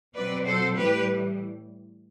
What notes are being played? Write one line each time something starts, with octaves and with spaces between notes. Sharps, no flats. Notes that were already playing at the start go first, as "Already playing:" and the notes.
B2 F#3 C4 B4 D5
A4 C5
A2 E3 G3 G4 B4